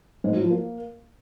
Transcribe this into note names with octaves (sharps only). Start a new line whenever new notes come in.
G#2
F#3
F3
A#3